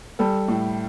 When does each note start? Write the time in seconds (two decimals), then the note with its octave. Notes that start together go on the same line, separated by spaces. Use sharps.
0.19 G3 A4
0.48 A2